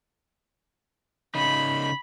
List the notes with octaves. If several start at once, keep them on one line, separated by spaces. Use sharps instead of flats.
C#3 D#4 B5